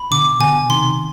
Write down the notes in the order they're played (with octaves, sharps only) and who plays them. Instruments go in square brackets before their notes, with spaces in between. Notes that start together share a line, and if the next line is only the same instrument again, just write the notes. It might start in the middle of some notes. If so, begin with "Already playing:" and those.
Already playing: [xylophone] B5
[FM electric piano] B2 D3 [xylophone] D6
[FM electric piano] B2 D3 [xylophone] G#5
[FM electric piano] C3 D#3 [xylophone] C6